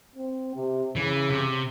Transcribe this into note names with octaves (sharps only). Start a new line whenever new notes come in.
C4
C3
C#3 E3
C3